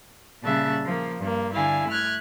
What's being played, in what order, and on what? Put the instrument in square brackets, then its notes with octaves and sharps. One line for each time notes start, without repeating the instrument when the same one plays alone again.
[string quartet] A#2 C#3 G3 E5 A5 F#6
F3 A#3
G2 A#3
D3 E4 F5 G#5
A3 F6 F#6 G#6